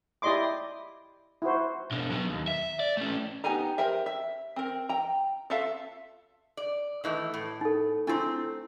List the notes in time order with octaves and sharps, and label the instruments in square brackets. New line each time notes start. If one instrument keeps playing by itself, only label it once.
[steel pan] E4 G4 D5 D#5 C6 D6
E4 F#4 C5
[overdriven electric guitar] B2 D4
F#3 B3
D#2
E5
D5
A3 C#4
[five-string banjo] B3 D#4 G4 G#5 A#5
G4 A#4 C5 E5
E5
C4 A#4
G5 A#5
F4 F#4 A4 E5 F5
[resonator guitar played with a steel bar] D5
D#3 E3 A3
A2
[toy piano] D#4 A4
[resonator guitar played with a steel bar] A3 C4 [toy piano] D4 E4 F4